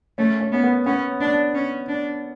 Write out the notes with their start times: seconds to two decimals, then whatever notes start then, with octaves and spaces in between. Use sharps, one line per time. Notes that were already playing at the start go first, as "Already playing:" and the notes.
0.18 A3 C#4
0.40 C#4
0.52 B3 C#4
0.64 B3
0.86 B3 C#4
1.20 D4
1.54 C#4
1.88 D4